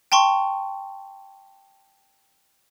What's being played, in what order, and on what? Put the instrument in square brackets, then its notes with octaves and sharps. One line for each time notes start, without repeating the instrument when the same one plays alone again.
[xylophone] G5 A5 C6 C#6